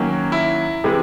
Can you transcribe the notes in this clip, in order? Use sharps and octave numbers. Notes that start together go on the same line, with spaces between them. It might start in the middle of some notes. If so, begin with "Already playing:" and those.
Already playing: D#3 F#3 A#3 C#4
E4
C3 E3 G#3